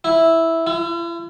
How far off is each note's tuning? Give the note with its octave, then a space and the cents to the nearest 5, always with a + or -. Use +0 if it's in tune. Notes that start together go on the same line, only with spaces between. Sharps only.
E4 -5
E4 +45